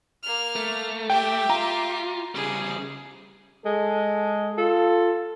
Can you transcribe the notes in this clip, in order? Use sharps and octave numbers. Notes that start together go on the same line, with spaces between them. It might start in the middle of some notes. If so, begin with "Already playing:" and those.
A#3 F6
A3
G4 E5 G5
F4 A#5
C#3 G3 G#4
G#3 A4
F4 A4